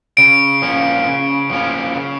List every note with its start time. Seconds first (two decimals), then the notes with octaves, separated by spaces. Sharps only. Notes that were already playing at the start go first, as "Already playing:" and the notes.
0.17 C#3 D7
0.62 F3 A#3 C#4
1.06 C#3
1.50 F3 A#3 C#4
1.95 C#3